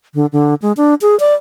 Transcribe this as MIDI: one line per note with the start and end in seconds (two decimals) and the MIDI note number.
0.15 0.26 50
0.33 0.54 50
0.62 0.72 56
0.77 0.94 62
1.01 1.18 68
1.20 1.34 74